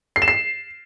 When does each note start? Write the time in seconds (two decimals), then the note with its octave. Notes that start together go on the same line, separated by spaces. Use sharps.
0.16 C7
0.22 E7
0.28 C7